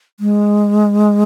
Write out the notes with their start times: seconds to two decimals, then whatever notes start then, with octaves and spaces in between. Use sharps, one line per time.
0.20 G#3